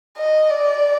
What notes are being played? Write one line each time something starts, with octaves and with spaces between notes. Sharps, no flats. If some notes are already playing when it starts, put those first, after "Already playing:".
D#5
D5